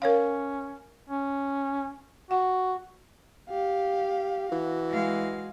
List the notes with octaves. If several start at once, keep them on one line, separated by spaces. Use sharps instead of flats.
C#4 A#4 C#5 F5
C#4
F#4 F#5
G4 F5
E3 F#4
G#3 F5